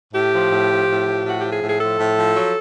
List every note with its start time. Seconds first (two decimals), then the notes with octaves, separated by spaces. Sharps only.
0.13 A2 G4
0.31 F3
0.50 A2
0.69 F3
0.88 A2
1.07 F3
1.25 A2 F#4
1.40 F3 G4
1.53 G#4
1.62 A2
1.67 G#4
1.81 F3 A4
2.00 A2
2.17 F3
2.36 F#3